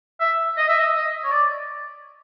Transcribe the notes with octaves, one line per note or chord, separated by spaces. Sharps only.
E5
D#5
E5
D#5
D#5
C#5
D5